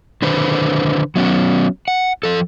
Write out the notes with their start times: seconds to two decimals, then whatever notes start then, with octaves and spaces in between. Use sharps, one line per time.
0.22 D3 D#3 B4 C5
1.16 F#3 B3 C#4
1.88 F#5
2.23 F3 A4